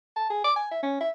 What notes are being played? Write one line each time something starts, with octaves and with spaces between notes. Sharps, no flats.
A5
G#4
D6
G#5
E5
C#4
E5